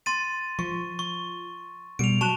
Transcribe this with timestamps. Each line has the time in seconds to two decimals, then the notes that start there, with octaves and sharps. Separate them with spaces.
0.06 C6 A6 D#7
0.59 F3 C#6
0.99 C#6
1.99 B2 G3 D7 F7
2.21 F#3 A5 C#6 F#6 E7